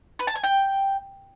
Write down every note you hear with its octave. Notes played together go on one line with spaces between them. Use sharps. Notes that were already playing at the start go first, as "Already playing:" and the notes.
B4
A5
G#5
G5